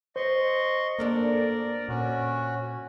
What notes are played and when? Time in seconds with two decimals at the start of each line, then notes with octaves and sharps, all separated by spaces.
0.16 C5 D#5 C6 C#6
0.99 F#2 A#3 D4 A4 A#4 D5
1.89 A#2 C#4 F#4